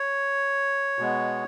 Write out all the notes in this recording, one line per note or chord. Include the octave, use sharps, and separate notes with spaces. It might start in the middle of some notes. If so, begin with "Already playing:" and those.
Already playing: C#5
B2 G#3 B3